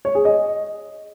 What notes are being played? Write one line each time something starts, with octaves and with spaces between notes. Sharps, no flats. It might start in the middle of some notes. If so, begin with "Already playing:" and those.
C#5
G#4
D#5